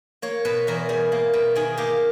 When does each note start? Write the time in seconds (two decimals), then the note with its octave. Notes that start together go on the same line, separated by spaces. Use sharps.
0.22 A#3 C#5
0.45 B2 B4
0.67 E2 A#4
0.89 G3 G#4
1.12 A#3
1.34 B2
1.55 D#3 G#4
1.77 A#3 G4